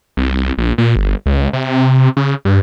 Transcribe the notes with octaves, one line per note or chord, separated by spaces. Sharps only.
C2
A#1
A#2
G1
C#2
C3
C#3
G2